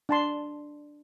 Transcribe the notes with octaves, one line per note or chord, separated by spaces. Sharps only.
D4 A5 C6